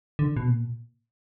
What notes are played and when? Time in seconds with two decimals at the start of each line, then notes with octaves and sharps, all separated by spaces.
0.19 D3
0.36 B2
0.48 A#2